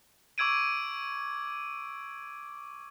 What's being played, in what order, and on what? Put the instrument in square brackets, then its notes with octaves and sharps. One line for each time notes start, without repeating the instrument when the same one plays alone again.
[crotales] C#6 D6 E6 G#6 D7 D#7